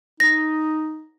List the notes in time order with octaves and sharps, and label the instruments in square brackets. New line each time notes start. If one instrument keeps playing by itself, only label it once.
[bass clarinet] D#4 [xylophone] A#6